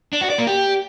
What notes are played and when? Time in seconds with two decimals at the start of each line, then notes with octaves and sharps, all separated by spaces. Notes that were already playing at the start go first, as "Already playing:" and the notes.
0.13 D4
0.21 F#4
0.30 D5
0.38 A#3
0.47 G4